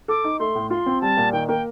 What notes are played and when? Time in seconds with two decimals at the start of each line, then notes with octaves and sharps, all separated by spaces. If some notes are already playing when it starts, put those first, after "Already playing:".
0.08 A4 D6
0.24 D#4
0.40 A3 C6
0.55 A2
0.70 F4 C6
0.86 C4
1.01 G3 A5
1.17 A#2
1.33 D#3 G5
1.48 A#3 G5